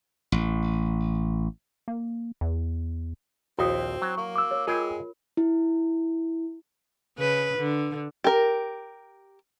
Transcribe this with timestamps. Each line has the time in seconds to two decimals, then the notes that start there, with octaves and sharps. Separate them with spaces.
0.32 A1
1.88 A#3
2.41 E2
3.59 A#1 D#2 C4 E4 F#4 D#6
4.02 F#3
4.17 A#3 C#6
4.36 D6 E6
4.51 C#5
4.67 G#3 F4 G#4 A#4 G5 G#5
5.37 E4
7.18 C#3 B4
7.58 D3
8.24 G4 A#4